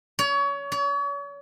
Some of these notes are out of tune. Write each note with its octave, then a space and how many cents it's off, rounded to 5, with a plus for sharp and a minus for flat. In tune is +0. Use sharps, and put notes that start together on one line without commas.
C#5 +30
C#5 +40